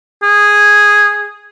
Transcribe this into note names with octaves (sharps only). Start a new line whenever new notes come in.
G#4